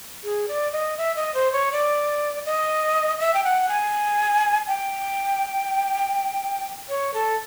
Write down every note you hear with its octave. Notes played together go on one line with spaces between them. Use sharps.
G#4
D5
D#5
E5
D#5
C5
C#5
D5
D#5
E5
G5
F#5
G#5
G5
C#5
A4